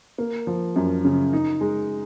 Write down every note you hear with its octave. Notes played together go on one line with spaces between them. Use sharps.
A#3
F3
F#2
C#3
D#4
G#3